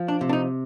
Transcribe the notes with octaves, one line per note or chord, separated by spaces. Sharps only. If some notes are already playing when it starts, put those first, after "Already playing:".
Already playing: F3
D4
C3
D4
D#4